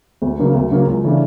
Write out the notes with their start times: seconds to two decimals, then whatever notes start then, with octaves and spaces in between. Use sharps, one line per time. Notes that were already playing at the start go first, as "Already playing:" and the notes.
0.22 D2
0.39 C#3 F#3 A#3
0.54 D2
0.71 C#3 F#3 A#3
0.87 C#2
1.04 C#3 E3 A3 D4